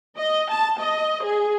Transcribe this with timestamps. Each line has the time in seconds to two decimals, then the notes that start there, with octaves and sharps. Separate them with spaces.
0.16 D#5
0.51 A5
0.80 D#5
1.23 G#4